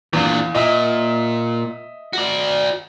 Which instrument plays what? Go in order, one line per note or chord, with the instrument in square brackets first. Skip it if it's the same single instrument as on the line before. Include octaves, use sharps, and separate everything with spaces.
[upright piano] E2 F5 [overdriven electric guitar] A#2 D3
[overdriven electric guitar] A#2 [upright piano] D#5 E5
[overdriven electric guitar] F#4 D5